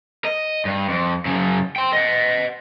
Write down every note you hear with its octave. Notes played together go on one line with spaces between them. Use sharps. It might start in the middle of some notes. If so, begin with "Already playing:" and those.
D#5
G2
F2
F#2 C#3
G5 C6
D#5 F#5